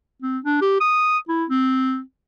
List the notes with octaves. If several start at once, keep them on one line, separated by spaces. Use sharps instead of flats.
C4
D4
G4
D#6
E4
C4